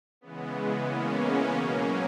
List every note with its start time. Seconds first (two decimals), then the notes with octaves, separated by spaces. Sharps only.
0.21 C#3 E3 G#3 B3
0.55 B3
0.87 A#3 C#4
1.53 B2 F#3 A#3 C#4